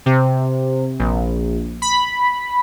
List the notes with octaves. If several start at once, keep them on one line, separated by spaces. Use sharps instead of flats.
C3
A#1
B5